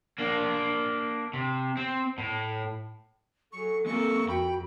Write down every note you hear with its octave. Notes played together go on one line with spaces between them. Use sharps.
A#3 D4
C3
C4
A2
F#3 G#4 A4 C#6
G#3 A#3 C4 A4 A#4 C#6
F2 F#4 G5 B5